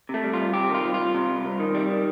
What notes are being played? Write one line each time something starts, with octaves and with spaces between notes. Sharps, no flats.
C3 A3
G3
C2 F4
C3 G4
D#3
F4
C2
F4
C2
C3
C2
C2
D#3
G3
D#3